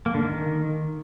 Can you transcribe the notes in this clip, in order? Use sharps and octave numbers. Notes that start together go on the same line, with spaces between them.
A#3
D3
D#3